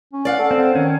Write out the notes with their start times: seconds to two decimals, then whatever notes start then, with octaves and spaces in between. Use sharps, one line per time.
0.13 C#4
0.25 D5 F5 F#5
0.39 A4
0.51 C4
0.75 D#3 C#4